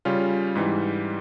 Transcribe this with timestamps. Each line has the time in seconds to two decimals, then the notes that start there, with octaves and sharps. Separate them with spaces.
0.05 C#3 G3 C#4 F4
0.56 G#2 E3 G3